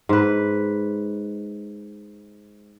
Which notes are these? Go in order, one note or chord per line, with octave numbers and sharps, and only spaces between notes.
G#2 B4